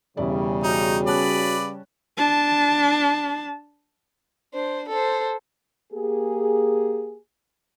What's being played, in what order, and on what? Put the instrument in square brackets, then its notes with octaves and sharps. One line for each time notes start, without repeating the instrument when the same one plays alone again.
[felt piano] E1 E4 D5 [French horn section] C#3 G3
[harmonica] D#4 [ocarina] F#4
[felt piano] C#4 A5 F#6 [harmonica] B4 D5
[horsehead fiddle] D4 A5
[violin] D4 C5
A4 C5
[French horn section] A#3 G4 G#4